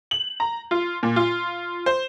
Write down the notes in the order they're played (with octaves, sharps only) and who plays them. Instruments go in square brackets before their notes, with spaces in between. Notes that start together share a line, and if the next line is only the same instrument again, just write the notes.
[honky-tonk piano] F#7
A#5
F4
A#2
F4
C5